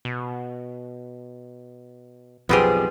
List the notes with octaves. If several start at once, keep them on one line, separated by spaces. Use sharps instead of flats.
B2
B1 F2 F3 G3 B3 C4 G4 G#4